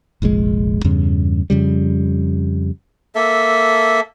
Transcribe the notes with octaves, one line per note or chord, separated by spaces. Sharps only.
F1 A#1 B2 G#3
E2 G2 C#3
F2 C#3 G3
A#3 A4 E5